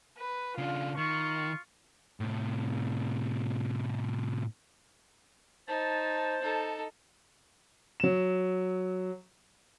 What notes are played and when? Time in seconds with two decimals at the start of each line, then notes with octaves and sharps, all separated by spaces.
0.18 B4
0.58 C#3 D4 F4
0.98 D#3 F4 C#6
2.21 A2 C3
5.68 D#4 C5 A5
6.42 D#4 A4
8.00 F#3 E7